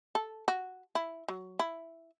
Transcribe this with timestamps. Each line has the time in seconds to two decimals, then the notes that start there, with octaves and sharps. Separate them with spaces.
0.15 A4
0.48 F#4
0.95 E4
1.28 F#3
1.59 E4